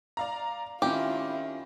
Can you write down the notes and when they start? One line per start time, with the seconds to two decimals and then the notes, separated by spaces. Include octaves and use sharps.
0.17 D5 F5 A#5
0.82 D#3 C#4 E4 F4 G4